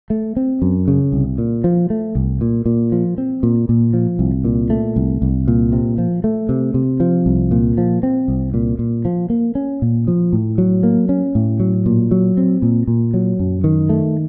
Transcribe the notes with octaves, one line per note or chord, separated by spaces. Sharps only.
A3
C4
F#2
C#3
C2
A#2
F3
A3
C2
A#2
A#2
F3
C4
A#2
A#2
F3
C2
A#2
A3
C2
C2
A#2
C3
F3
A3
C3
C3
F3
C2
A#2
F3
C4
C2
A#2
A#2
F3
A#3
C#4
A#2
F3
A2
F#3
A#3
C#4
A2
F#3
A#2
F#3
C4
A#2
A#2
F#3
F#2
D#3
A3